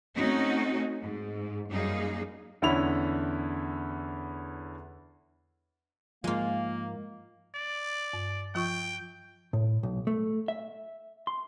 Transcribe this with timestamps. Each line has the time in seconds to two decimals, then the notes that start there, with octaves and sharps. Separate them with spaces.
0.15 A3 C4 C#4 D#4 F#4
1.02 G#2
1.70 F#2 G3 A#3 D#4 G#4
2.62 E2 D3 C#4 E4 B5 F7
6.24 G#2 F3 G#3 A#3 F4
7.55 D5
8.13 G2
8.55 F3 F4 G5 C#6
9.53 A2
9.83 B1
10.07 A3
10.48 E5
11.27 C6